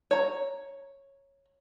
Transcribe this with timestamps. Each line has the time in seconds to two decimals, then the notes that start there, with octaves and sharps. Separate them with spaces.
0.11 C#5 A#5